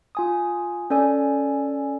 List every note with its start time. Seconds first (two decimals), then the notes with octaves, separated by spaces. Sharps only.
0.15 F4 G#5 D#6
0.90 C#4 A4 D5 G#5